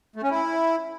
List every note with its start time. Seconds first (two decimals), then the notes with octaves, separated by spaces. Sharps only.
0.16 A3
0.23 C#4
0.30 E4